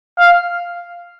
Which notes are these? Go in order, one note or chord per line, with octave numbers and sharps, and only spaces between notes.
F5